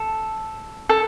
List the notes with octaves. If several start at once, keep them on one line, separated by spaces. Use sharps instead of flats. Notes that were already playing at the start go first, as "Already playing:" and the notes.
Already playing: A4
A4